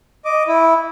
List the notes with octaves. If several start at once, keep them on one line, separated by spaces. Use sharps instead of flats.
D#5 D6
E4